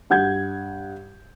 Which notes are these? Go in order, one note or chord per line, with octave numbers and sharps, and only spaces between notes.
G2 F#5 G6 G#6